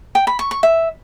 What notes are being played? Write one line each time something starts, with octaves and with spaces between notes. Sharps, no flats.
G5
B5
C#6
C#6
E5